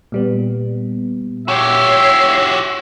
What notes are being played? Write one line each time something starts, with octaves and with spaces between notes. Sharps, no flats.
A#2 G3 B3
F#4 G4 C#5 E5 C7